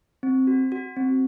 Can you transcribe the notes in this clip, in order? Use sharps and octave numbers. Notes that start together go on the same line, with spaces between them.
C4
F#4
F#4
C4